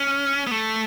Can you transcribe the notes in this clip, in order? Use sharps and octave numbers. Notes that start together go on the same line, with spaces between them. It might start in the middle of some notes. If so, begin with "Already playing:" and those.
Already playing: C#4
B3
A3